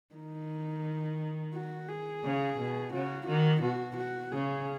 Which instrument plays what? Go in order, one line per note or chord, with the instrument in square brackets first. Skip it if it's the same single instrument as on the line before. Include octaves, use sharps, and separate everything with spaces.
[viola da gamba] D#3 [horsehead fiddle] D#4
[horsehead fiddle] F#4
G#4
[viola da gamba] C#3
B2
[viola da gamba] C#3 [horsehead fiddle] F#4
[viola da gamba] D#3 [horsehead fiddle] F#4
[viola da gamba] B2 [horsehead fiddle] F#4
[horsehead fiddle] F#4
[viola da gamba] C#3 [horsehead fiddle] G#4